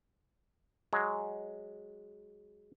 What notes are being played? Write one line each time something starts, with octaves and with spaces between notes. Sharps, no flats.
F#3 G#3